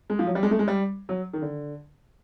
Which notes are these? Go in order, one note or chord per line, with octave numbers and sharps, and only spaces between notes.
G#3
F3
F#3
G3
G#3
A3
G#3
G3
F#3
D#3
D3